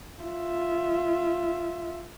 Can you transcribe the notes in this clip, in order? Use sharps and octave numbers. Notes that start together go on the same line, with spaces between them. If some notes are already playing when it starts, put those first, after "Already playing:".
F4 E5